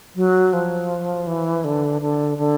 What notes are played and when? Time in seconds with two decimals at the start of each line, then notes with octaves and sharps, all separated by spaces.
0.16 F#3
0.53 F3
1.27 E3
1.64 D3
2.01 D3
2.38 D3